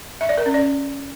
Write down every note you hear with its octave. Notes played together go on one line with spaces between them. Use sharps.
E5
D5
A#4
C#4
D5